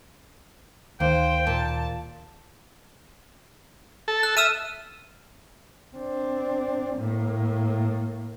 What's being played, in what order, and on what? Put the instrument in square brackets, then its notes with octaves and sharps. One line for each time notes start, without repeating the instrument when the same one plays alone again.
[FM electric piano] D2 D#3 [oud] A#3 [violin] C5 [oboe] G5
[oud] A#2 [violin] A5
[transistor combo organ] A4
[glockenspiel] F#6
[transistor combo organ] E5 [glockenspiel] E6 F6 D#7
[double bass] C4 D4
A2 A#3